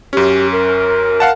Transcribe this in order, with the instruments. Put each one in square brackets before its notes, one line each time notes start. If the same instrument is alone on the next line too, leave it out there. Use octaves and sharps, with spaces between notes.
[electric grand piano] F#2 C#4 [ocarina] G4
[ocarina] A#4
[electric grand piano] F5 F#5 A5